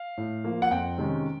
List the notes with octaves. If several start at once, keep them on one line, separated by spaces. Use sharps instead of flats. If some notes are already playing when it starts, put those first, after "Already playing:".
Already playing: F5
A2
F3 A#3
F#5
F2 G5
C3 D#3 G#3 C#4